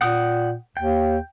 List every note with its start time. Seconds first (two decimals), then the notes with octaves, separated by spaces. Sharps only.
0.01 A#2 F#5 G5 D#6
0.77 D#2 G5